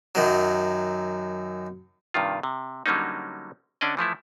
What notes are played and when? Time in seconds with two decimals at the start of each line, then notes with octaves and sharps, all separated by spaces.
0.15 F#2 D#3 F#3
2.14 G2 C3 D#3 F4
2.43 C3
2.86 D3 F#3 G3 A#3 C#4 D#4
3.81 D3 C#4 D4 D5 D#5
3.97 E3 F3 A3 E4